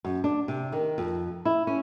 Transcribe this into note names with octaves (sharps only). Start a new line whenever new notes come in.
F#2
D4
C3
D#3
F2
E4
C#4